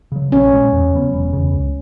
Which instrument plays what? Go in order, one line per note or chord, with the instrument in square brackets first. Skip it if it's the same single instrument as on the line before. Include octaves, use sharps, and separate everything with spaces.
[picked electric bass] C#3 F#3
[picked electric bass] A#1 [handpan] C#4
[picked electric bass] A#2 G#3
E2
C#3 F#3 B3
E1
E2 C#3
C#2